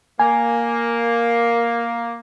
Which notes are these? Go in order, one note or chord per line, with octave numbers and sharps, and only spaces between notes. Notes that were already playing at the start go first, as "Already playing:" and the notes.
A#3 G#5